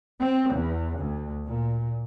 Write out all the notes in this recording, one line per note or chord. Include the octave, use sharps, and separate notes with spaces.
C4
E2
D2
A#2